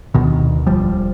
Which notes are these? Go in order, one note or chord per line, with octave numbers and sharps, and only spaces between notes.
D2 B2 D#3
E1 F3 G3